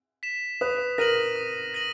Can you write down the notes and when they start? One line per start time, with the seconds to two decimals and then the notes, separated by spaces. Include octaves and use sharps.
0.23 B6 E7
0.61 B4 D#6
0.98 A#4 A#6 D#7 F#7
1.36 D#6
1.74 A#6 D#7 F#7